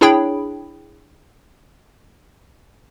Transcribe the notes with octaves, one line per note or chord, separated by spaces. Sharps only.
D4 E4 G#4 C#5 G5 B5